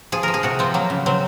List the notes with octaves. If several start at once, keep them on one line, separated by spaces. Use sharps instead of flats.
F3 G#4
F3 A#4
G#4
C3 F#4
F3 C4
F#3 A#3
C#3
F#3 C4